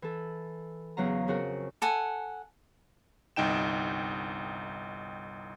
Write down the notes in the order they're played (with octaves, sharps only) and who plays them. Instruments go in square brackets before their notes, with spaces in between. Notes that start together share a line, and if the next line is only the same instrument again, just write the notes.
[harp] E3 A4
E2 C#3 F#3 F5 A#5
F2 C#3 F#4 A#4
[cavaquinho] A4 F#5 G#5
[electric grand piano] G1 C2 D#4 G5 E7